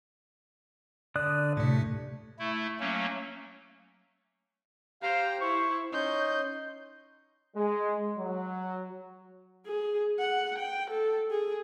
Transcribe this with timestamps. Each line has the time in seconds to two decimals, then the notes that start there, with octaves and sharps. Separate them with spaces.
1.16 D3 D5 D#6 F#6
1.57 A2 C3 A3
2.39 A3 E4
2.80 F#3 A3 A#3 C#4
5.03 G4 C5 F5 G5 A#5
5.41 E4 C5 C#6
5.93 C#4 D#4 D#5 C6 G6
7.55 G#3
8.18 F#3
9.66 G#4
10.19 F#5
10.59 G5
10.91 A4
11.31 G#4